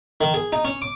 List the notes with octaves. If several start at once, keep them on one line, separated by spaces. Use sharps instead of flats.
D#3
G#4
D#4
C#4
D6